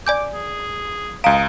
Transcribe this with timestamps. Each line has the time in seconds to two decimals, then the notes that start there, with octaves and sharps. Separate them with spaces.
0.07 D5 G#5 D6 G6
0.34 G#4
1.24 C#2 D#5 F5 A#5 D7